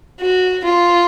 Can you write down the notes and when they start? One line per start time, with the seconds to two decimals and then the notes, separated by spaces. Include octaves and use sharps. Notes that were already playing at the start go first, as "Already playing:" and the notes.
0.20 F#4
0.64 F4